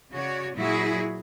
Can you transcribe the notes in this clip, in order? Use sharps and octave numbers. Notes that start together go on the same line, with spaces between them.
C#3 F#4 C#5 D5
A#2 F#3 E4 F#4 G#4